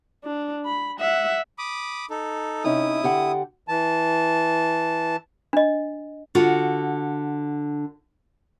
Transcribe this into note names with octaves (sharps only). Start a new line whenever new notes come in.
D4
B5
E5 F#5
B5 D6 D#6
D#4 A4
C3 C#4 D#4 E4 D#6
D3 G4 F#5
E3 A5
D4 D#5
D3 F4 F#4